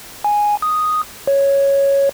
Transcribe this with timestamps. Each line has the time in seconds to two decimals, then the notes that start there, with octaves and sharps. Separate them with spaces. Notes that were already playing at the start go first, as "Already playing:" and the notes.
0.24 G#5
0.62 D#6
1.27 C#5